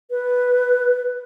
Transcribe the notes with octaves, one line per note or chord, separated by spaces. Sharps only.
B4